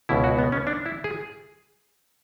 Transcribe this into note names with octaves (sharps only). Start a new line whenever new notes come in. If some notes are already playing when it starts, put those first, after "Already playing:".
C#2 B2 E4
F#4
B3
C#4
D4
E4
G#4